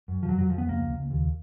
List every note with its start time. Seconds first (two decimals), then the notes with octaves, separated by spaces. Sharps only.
0.08 F#2
0.23 F3
0.28 F2 F#3
0.38 F#3
0.49 F2 F3
0.58 B3
0.69 C#2 A#3
0.90 C#2
1.11 D#2